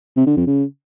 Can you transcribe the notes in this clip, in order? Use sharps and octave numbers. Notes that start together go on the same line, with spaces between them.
C3
D3
F2
C#3